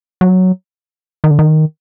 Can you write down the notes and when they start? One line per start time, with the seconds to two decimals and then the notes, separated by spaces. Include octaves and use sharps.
0.21 F#3
1.24 D#3
1.31 D3
1.39 D#3